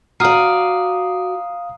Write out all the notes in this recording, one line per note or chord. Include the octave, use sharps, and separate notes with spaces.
F#4 D5 F5 A#5 D#6 F6 C7 D#7